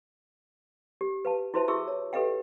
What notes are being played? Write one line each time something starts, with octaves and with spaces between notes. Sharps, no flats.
G4
B4 F5 A5
E4 F#4 B4 C5 E5 A5
E4 F#4 G#4 E5 C#6 E6
C#5
G4 A4 B4 D#5 F5 G5